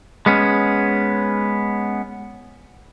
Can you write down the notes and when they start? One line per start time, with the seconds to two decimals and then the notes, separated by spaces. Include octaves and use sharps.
0.26 G#3 B3 C#4